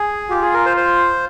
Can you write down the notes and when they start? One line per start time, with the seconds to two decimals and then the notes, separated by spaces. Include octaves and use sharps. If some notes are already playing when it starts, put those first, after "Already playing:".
Already playing: G#4
0.31 F4 G4
0.42 G#4
0.53 A#4
0.66 C5
0.77 C5